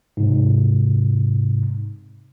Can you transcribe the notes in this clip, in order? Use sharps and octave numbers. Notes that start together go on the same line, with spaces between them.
G#2 C3